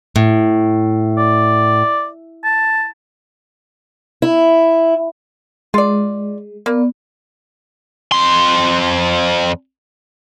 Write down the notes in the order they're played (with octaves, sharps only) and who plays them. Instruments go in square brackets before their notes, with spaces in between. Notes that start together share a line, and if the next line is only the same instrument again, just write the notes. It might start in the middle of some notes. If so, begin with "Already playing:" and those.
[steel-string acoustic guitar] A2
[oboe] D5
A5
[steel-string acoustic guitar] E4
[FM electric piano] G#3 [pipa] F4 D5
[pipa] A#3 [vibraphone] B3 D5
[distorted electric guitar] F2 C6